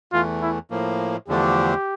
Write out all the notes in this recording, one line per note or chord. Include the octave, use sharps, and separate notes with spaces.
E2 E3 A3 F4
E4
A2 F3 A#3
E2 D3 F3 A3 D4 G4